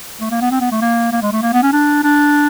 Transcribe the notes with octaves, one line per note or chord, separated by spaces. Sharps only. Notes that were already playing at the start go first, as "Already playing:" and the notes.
A3
A#3
B3
C4
B3
A3
A#3
A#3
G#3
A3
A#3
B3
C#4
D4
D4